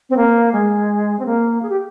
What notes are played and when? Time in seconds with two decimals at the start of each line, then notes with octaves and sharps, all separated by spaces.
0.10 C4
0.17 A#3
0.53 G#3
1.19 C4
1.26 A#3
1.62 G#4
1.69 G4